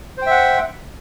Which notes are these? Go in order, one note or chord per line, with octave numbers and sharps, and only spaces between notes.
C5 E5 F#5 G5